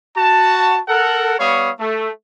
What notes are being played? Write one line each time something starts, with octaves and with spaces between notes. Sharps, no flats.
F#4 A5
A4 A#4 F#5
G3 B3 C#5 F5 C#6 D#6
A3